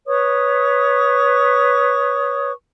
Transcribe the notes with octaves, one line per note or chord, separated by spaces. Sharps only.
B4 C#5 C#6 D#6